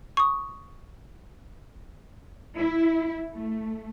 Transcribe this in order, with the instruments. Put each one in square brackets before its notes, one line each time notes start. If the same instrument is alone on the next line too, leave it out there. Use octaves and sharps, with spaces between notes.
[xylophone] C#6 D#6
[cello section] E4
A3